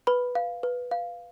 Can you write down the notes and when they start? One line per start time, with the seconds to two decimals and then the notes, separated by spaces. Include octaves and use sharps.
0.07 B4 B5
0.35 F5
0.63 B4
0.91 F5